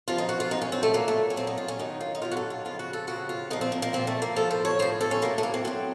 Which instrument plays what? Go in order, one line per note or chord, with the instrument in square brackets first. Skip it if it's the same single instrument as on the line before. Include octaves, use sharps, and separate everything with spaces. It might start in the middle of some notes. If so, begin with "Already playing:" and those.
[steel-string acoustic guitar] F#2 F3 F4
D#4
F#4
F4
F#2 F3 D#4
C#4
C4
A3
A#2 F#3 A#3
A3
C#4
A#2 F#3 C4
D#4
F4
C#4
F#2 D#3 F#3 D#4
F4
D#4
F#2 D#3 F#3 F4
F#4
A4
F4
F2 C#3 F3 F4
F#4
A4
F2 C#3 F3 F#4
F4
A#2 F3 D#4
C4
A#3
A#3
A#2 F3 C4
A3
A#3
A2 F3 A4
C5
C#5
A2 F3 C5
A4
C#4
A2 F#3 A#3
A3
A#3
C4
A2 F#3 C4